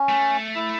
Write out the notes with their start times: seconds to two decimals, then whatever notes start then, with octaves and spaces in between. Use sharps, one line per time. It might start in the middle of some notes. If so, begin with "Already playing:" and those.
Already playing: C#4
0.09 A3
0.55 E4